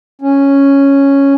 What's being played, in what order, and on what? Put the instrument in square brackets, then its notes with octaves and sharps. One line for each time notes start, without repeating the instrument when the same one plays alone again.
[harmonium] C#4